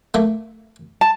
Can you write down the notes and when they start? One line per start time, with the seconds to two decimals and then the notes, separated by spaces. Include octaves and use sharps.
0.14 A3 A#3
1.01 A5